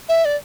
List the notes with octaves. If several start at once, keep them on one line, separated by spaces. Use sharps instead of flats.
E5
D5